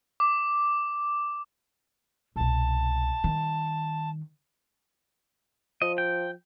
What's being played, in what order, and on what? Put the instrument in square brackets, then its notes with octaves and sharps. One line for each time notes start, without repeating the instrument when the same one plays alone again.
[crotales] D6
[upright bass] C2 B2 [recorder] A5
[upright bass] D#3 G3
[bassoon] F3 [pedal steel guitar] D#5
[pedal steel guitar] G5